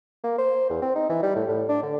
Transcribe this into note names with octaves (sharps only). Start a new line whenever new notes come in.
A#3
C5
E2
C4
D#4
E3
G3
A2
A2
D4
D3